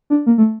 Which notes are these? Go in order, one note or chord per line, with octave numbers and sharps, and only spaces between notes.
D4
A#3
A3